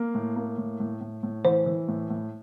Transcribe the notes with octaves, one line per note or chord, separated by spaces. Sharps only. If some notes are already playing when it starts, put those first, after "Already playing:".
Already playing: A#3
A2
A#3
A2
A2
A2
A2
E3 C5
E3
A2
A2